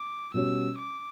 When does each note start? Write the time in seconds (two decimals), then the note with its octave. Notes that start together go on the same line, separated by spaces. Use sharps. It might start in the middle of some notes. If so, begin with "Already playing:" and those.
Already playing: D6
0.34 B2 G3 C#4 F#4 C#5 E6
0.78 D6